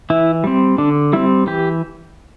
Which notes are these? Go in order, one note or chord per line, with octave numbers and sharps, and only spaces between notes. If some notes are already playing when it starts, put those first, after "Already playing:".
E3 E4
G3 C4
D3 D4
G3 C4 E4
E3 G4